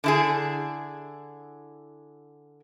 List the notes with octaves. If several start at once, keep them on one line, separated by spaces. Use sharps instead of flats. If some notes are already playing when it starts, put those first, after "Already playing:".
D3 E4 G#4